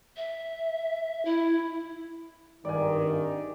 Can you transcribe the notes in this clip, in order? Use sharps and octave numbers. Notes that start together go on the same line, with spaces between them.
E5
E4
G#1 G2 D#3 D5 G#5